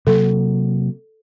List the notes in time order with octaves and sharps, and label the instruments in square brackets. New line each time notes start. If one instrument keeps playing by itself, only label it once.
[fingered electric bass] C3 F#3 A#3 [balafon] A4